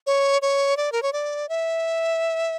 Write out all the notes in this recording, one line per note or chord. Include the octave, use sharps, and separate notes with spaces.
C#5
C#5
D5
A#4
C#5
D5
E5